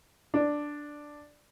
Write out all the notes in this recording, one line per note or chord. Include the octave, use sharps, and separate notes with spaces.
D4